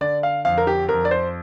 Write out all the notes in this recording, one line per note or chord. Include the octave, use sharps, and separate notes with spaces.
D3 D5
F5
F2 F5
A#4
G4
F2 A#4
D5
C5